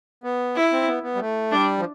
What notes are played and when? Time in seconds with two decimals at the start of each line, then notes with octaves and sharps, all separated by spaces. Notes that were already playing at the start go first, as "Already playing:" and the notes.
0.24 B3
0.56 E4
0.72 C4
0.88 B3
1.03 B3
1.15 G3
1.20 A3
1.52 G3 D4
1.79 F3